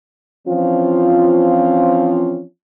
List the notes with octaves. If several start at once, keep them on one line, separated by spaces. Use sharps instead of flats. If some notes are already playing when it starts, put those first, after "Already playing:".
E3 F3 C4 C#4 F4